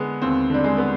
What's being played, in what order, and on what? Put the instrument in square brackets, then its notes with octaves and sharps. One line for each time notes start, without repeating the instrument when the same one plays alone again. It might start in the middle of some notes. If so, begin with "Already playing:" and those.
Already playing: [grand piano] D3 G#3 B3
[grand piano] D#2 [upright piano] C4
[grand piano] D3 [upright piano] G3
[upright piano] G#3
[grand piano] B3